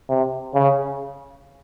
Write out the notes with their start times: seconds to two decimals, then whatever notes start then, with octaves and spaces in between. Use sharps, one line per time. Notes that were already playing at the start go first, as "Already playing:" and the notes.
0.09 C3
0.55 C#3